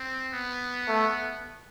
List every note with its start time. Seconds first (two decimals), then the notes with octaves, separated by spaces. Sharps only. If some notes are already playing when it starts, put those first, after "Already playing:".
Already playing: C4
0.33 B3
0.88 A3